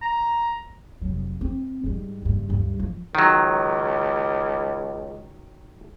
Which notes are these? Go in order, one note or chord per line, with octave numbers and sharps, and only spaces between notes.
A#5
F1 F#3
C4
G#2 G3
F#1 G2
D2 G2
F3
C#2 D#3 F#3